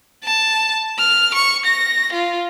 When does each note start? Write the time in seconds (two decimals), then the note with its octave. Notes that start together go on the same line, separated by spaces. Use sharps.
0.24 A5
0.99 F6
1.35 C#6
1.66 A#6
2.13 F4